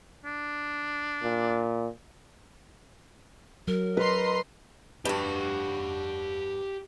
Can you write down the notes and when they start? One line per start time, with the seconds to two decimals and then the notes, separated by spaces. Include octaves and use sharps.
0.25 D4
1.23 A#2
3.68 F#3 A#4
3.97 B4 D#5 A#5 C6
5.05 G2 F#4 G4 F5